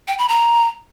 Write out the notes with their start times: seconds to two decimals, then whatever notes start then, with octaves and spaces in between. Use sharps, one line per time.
0.08 G5
0.18 B5
0.29 A#5